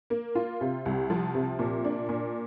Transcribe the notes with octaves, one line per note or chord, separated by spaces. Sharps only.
A#3
F4
C3
C2
F3
C3
A#2
D4
A#2